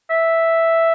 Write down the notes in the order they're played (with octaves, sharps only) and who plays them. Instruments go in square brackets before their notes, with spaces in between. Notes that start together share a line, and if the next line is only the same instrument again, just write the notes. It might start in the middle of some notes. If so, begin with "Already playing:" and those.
[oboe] E5